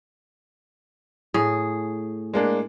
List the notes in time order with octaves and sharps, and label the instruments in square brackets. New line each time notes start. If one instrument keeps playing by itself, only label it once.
[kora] A2 G#4
[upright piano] G#3 A#3 D4